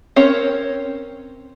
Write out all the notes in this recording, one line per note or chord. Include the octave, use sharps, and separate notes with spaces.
C4 C#4 A#4 C#5